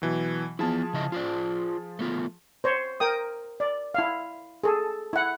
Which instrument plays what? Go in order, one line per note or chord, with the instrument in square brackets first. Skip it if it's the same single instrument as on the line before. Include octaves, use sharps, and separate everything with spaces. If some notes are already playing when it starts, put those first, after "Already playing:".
[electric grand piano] B2 E3 F#3
[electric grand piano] F3 G#4 A5 [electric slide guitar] B3 E4
[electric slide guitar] C#3 E4 D#5
F4 C5 D5
A3 B3 F4
[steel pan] C5 C#5
A#4 G5 D#6
D5
E4 F5
G#4 A4
E4 F#5